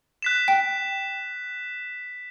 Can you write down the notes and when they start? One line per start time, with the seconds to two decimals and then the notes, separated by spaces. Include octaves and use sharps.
0.22 F#6 B6 E7
0.48 G5